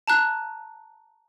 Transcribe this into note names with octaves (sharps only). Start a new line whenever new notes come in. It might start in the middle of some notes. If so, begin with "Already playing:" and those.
A5 A#5 F#6